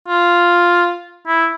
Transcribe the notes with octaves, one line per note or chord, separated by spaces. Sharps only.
F4
E4